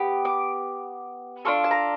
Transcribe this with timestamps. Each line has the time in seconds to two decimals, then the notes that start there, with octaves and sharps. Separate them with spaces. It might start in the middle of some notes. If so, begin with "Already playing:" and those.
Already playing: B3 G4
0.25 D6
1.45 D4 F4 A4 C#6
1.64 A5
1.71 A#5